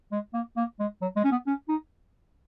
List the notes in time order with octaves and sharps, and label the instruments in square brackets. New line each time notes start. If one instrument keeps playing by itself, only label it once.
[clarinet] G#3
A#3
A#3
G#3
F#3
G#3
C#4
B3
C#4
D#4